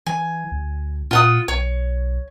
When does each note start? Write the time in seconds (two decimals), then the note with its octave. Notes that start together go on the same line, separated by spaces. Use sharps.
0.06 E3 G#5
0.52 D2
1.11 A#2 F4 F#5 D#6
1.48 B1 C#5